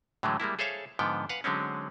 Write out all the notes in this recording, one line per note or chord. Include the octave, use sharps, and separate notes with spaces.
A2 D3 E3 F#3 G#3 A3
G3 G#3 A#3 E4
G#4 A4 C5 C#5 E5 F5
G#2 D3 F3 B3 G5
B4 F5 F#5
D3 F#3 G#3 C4 C#4